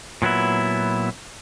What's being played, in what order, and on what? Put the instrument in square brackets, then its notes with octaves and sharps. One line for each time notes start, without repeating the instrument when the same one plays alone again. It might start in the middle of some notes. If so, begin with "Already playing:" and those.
[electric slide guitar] A#2 F#3 B3 E4